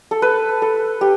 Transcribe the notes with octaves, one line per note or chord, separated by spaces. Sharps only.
A4
B4
A4
G4